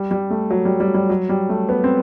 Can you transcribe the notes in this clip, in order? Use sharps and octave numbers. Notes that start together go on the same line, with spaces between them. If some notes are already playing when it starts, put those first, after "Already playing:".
Already playing: G3
G3
A3
F#3
G3
G3
G3
F#3
G3
A3
B3
C4